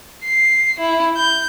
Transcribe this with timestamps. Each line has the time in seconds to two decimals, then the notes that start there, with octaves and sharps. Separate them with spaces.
0.25 C7
0.80 E4
1.16 G6